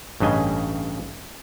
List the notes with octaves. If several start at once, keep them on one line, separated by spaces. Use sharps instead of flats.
A1 G2 C#3 D#5 G#5